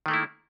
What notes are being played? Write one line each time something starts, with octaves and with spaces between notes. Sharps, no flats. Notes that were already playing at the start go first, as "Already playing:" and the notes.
D#3 A3 A#3 E4